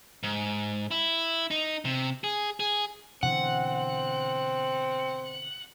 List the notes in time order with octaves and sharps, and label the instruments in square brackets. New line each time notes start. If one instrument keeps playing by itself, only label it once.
[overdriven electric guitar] G#2
E4
D#4
C3
G#4
G#4
[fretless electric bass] B2 D3 E3 [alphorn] C4 [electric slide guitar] F#5